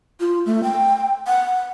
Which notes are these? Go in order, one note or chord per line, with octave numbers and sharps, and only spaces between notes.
F4
A3
G5
F#5